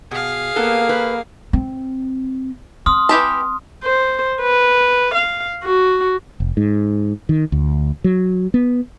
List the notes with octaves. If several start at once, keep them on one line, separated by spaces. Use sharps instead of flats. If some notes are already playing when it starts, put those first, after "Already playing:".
B2 G#4 F5
A#3 B3 A4
B4
C4
C4 C6 D#6 F6
E3 G4 A5
C5
B4
F5
F#4
F1
G#2
D#3
D2
F#3
B3